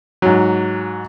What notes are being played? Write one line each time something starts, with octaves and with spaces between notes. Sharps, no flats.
G#2 F#3